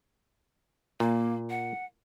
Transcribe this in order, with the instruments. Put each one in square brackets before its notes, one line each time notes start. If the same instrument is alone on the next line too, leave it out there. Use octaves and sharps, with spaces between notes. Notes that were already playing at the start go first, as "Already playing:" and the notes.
[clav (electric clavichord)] A#2 [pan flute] A#3
[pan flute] F#5